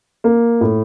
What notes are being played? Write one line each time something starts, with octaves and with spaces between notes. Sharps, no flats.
A#3
A2